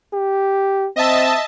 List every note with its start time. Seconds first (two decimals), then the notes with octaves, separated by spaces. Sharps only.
0.13 G4
0.96 C4 D#5 E5 A5